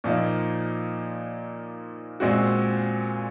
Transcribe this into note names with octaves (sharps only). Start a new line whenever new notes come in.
A#2 F3 A#3 D#4
A#2 G#3 C4 F#4